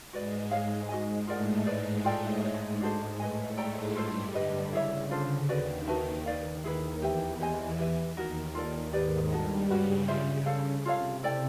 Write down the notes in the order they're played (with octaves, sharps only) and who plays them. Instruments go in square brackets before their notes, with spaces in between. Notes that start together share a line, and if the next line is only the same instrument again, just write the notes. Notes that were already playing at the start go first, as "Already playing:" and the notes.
[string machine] G#2 G#3 [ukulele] F#4 B4 D5
[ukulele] G#4 C#5 F5
[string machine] G#2 G#3 [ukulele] F#4 B4 D#5 G#5
[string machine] A2 A3 [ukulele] F4 A#4 D5 F#5
[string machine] G#2 G#3 [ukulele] G#4 B4 D5
[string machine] A2 A3 [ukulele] F4 A4 D5 G5
[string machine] G#2 G#3 [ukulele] G#4 C#5 E5
[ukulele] D4 F#4 A4 C5
[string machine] A2 A3 [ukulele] B4 D#5 G#5
[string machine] G#2 G#3 [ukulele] A4 D5 G5 A#5
[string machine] G2 G3 [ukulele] F4 A4 C5
[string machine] D3 [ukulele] G4 B4 D#5
[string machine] C#3 [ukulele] E4 G#4 C#5 E5
[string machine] D3 [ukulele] D4 F4 A4 C5
[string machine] D#2 D#3 [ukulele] F#4 B4 D5
[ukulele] F#4 B4 E5 A5
B4 D5 F5
[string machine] D#2 D#3 [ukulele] E4 G#4 B4
[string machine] E2 E3 [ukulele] G4 B4 E5 G5
[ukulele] G4 C5 D#5 G#5
G4 B4 E5
[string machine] D#2 D#3 [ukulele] D#4 F#4 A#4
[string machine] D#2 D#3 [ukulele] F4 A4 D5
[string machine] G#2 G#3 [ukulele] G4 B4 D5
[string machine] G2 G3 [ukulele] D#4 F#4 A4
[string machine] C#3 [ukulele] C#4 F#4 B4
[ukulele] F4 G#4 C5 E5
A4 C5 F5
[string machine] C3 [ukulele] F4 A4 C#5 F5
[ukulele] E4 A4 D5 G5